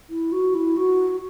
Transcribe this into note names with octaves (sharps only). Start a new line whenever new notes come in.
E4
F#4
E4
F#4